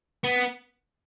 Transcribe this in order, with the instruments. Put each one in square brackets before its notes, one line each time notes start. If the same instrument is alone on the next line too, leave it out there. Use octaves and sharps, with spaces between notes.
[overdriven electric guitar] B3